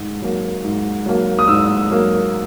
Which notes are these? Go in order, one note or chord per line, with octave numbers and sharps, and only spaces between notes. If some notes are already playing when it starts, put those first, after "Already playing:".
Already playing: G#2
F#3 A#3
G#2
F#3 A#3
D#6
G#2 E6
F#3 A#3